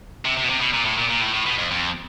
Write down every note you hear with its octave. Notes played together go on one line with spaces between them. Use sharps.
C3
C3
B2
C3
B2
A#2
A2
A#2
A#2
A2
A2
B2
F2
F2